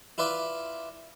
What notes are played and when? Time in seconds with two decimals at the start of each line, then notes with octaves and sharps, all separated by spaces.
0.18 E4 F4 B4 D5 E5